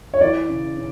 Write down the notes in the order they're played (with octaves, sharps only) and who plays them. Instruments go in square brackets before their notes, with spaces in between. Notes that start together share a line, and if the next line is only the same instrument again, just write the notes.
[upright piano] C#5
E3 D5
C#3
C#3